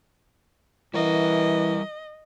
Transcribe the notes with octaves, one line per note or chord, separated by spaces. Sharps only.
E3 G3 A#4 D#5